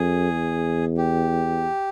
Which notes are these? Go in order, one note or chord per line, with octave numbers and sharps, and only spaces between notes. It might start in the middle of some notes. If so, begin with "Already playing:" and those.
Already playing: F2 G#4
E2
G4